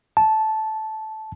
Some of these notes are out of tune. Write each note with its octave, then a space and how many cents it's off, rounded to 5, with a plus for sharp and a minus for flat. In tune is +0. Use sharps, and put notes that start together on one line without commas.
A5 -10